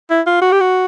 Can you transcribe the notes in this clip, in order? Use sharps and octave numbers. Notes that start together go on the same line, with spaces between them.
E4
F4
F#4
G4
F#4